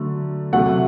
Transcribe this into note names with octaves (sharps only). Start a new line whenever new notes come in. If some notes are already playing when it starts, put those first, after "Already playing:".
Already playing: D3 F#3 A3
C3 F#3 A3 F#5